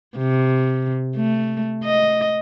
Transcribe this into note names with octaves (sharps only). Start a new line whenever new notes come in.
C3
A3
D#5